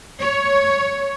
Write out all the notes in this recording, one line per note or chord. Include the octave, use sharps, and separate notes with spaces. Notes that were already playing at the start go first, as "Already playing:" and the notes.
C#5